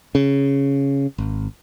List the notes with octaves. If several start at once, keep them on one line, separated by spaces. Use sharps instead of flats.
C#3
G#1